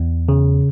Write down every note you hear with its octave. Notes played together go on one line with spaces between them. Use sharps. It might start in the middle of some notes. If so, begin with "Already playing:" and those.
Already playing: E2
C#3